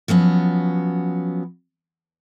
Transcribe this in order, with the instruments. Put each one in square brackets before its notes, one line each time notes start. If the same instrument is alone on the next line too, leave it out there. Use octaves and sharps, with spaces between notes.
[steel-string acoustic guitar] F3 F#3 B3 C#4